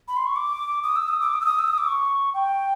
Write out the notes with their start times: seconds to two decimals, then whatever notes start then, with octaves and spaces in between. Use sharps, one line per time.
0.08 B5
0.17 C6
0.26 C#6
0.36 D6
0.83 D#6
0.96 E6
1.08 D#6
1.21 D6
1.34 D#6
1.41 E6
1.46 D#6
1.59 E6
1.68 D#6
1.78 D6
1.88 C#6
2.34 G5